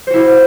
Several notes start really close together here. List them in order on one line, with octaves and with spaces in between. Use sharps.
C5 F#4 E4